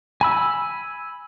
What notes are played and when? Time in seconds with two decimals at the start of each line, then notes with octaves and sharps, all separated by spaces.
0.21 G#5 B5 E6